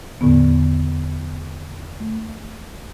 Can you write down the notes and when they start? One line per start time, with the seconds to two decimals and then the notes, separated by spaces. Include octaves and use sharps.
0.21 E2 A2 D3 B3
2.00 A3